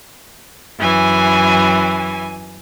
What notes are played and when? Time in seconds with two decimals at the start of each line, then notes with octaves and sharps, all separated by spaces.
0.78 F#2 E3 G#5